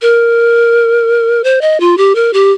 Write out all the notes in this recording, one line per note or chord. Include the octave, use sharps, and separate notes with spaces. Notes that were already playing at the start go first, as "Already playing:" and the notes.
A#4
C5
D#5
F4
G4
A#4
G4